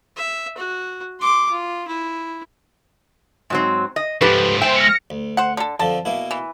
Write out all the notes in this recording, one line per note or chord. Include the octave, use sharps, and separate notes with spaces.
E5
F#4
C6 D6
F4
E4
G#2 F#3 C4
D#5
G#2 F3 G4 A4 B4
G#3 C5 E5 G5
F6 A#6 C#7
D2
C5 F#5
D3 A4
F2 D3 F3 A5
B2 A#3 E4
E3